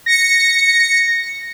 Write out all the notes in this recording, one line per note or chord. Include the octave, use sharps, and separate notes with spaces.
A#6 C#7